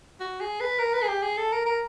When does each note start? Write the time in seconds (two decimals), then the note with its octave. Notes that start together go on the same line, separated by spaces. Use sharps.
0.20 F#4
0.40 G#4
0.60 B4
0.79 A#4
0.93 B4
1.02 G#4
1.09 G4
1.22 G#4
1.37 A4
1.52 A#4
1.66 A#4